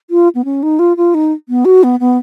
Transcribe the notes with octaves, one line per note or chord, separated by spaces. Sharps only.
F4
B3
C#4
D#4
F4
F4
D#4
B3
F#4
B3
B3